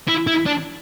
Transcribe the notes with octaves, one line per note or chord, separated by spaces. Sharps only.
E4
E4
D4